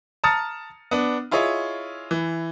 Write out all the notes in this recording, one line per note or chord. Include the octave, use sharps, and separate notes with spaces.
A5 A#5 D#6 F6 A6 C#7
B3 D4
E4 F4 G#4 C#5 D#5
E3